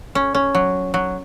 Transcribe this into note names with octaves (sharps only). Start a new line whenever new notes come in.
C#4
C#4
F#3
F#3